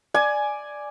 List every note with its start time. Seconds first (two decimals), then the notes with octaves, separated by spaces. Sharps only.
0.14 D5 G#5